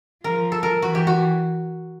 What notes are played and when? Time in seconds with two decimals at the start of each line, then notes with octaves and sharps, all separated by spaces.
0.24 F3 A#4
0.52 A4
0.63 A#4
0.82 E3 F#4
0.95 G4
1.07 F#4